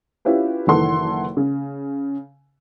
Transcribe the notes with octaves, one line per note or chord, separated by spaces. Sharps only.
C#4 E4 F4 G4 B4
F#1 D#3 E3 A4 F#5 C6
C#3